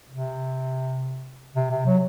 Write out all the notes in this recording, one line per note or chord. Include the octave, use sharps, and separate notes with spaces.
C3
C3
C3
F#3